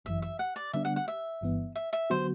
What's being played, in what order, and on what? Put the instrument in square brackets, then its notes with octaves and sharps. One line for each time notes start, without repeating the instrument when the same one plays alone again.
[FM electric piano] G1 F#2 E3 [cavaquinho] E5
[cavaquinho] E5
F#5
D5
[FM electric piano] D3 G3 B3 D4 [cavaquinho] E5
[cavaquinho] F#5
F#5
E5
[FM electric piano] G1 G2 E3 B3
[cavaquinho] E5
E5
[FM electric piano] D3 F#3 B3 F#4 [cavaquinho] C5